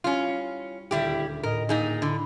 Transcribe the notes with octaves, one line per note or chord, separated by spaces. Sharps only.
G3 C#4 E4 F4
D#1 D2 G3 E4 G4 C7
A2 A#4 D#5 G5
A#2 D#4 G#4
D3 E4 B5